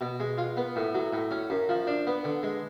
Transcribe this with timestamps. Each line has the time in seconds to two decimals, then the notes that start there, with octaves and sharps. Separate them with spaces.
0.01 B2
0.20 G#3
0.38 F4
0.57 B3
0.76 A2
0.94 F#3
1.13 A2
1.31 C#4
1.50 F#2
1.69 F3
1.87 D4
2.07 B3
2.24 D3
2.43 G#3